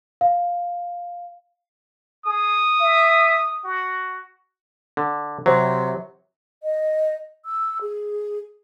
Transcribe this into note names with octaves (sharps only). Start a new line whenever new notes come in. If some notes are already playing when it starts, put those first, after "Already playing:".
F5
G#4 D#6
E5
F#4
D3
C3 F#3
D#5
E6
G#4